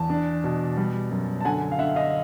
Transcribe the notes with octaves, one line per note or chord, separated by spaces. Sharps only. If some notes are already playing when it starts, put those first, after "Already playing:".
Already playing: E2 A5
D4
B2
G3
F#2
A5
D3 F#5 G#5
F5
D3 E5 F#5
D#5 F5